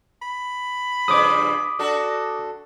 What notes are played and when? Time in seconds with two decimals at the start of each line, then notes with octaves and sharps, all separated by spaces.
0.22 B5
1.08 G2 C#3 F3 D6 D#6
1.79 D4 F#4 A4